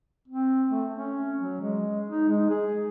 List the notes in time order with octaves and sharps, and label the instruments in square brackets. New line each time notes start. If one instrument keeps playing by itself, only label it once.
[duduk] C4
A3
C#4
F#3
G#3
D#4
G#3
G#4